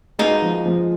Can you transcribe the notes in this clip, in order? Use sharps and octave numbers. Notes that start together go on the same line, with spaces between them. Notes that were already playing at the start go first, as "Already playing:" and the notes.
B2 G#3 A#3 D#4
F3
F3